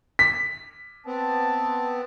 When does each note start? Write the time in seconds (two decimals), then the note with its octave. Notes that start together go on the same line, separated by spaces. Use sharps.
0.19 B6
1.06 B3 C4 A5